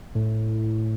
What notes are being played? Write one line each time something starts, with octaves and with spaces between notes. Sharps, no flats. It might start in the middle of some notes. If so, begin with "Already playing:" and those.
A2